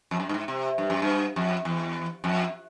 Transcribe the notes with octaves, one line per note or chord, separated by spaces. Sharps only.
F2
F#2
G2
G#2
C3
G2
F#2
G2
F2
E2
F2